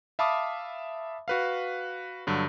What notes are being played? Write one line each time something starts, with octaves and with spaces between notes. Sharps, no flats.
E5 F5 A5 B5 D6 D#6
F#4 B4 F5
G2 D3 F#3